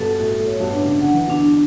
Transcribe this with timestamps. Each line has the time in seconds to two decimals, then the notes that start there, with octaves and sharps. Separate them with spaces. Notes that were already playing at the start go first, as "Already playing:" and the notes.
Already playing: G2 B2 A4
0.19 A2 F#4
0.39 A2
0.47 C#5
0.60 G2 B2
0.74 D4
0.81 A2 C#3
1.01 D3 F#5
1.14 E3
1.27 B2 D3 D4